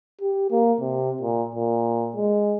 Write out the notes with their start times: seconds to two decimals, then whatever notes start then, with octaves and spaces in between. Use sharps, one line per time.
0.21 G4
0.51 A#3
0.80 C3
1.21 A#2
1.55 A#2
2.16 G#3